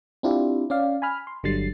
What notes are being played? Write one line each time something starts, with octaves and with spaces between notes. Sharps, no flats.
C4 D4 E4 F4 G4
C#4 D5 F5
G#5 B5 F6
C6
G1 D3 F#3 G3 A6 C7